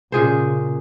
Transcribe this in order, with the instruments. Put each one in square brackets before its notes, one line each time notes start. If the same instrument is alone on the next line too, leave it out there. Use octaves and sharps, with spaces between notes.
[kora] A#2 G#4 C5 [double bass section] C#3